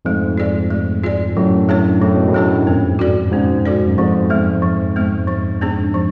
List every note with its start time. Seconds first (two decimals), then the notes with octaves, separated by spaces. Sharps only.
0.05 F2 G#2 A3
0.38 F4 G#4 D5
0.70 A3
1.03 F4 G#4 D5
1.36 F#2 A2 F#3
1.69 A3 D4 G#4 C#5
2.02 A2 F#3
2.16 B2
2.29 F#2 A2
2.34 A3 D4 G#4 C#5
2.67 F2 G#2 C#4
2.99 F#4 A4 D5
3.32 G#2 B2 C#4
3.65 F#4 A4 D5
3.87 F#2
3.98 F2 G#2 F3
4.30 G#3 B3
4.62 F3
4.96 G#3 B3
5.28 F3
5.61 B3 D4 G#4
5.94 F3